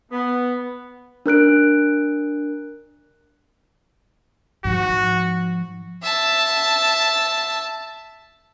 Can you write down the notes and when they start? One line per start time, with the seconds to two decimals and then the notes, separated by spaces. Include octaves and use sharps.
0.12 B3
1.26 D4 A#4 F#6 D7
4.65 G#2 F3 F#4
6.03 E5 A5